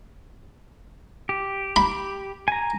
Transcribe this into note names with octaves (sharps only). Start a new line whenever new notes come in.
G4
B5
G#5 A#5